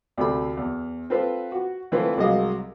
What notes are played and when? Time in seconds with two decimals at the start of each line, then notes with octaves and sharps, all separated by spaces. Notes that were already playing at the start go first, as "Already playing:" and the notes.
0.18 D2 C3 A4 B5
0.57 E2
1.10 C4 F4 A4 B4 C5
1.52 F#4
1.92 D3 E3 A3 C4 F4 B4
2.17 C2 F#3 G#3 D#5 F5